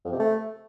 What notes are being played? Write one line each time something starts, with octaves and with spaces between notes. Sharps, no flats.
F2
C3
A3